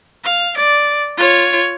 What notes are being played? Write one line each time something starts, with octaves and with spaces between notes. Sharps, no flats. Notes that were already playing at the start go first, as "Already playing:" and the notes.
F5
D5
F4 C#5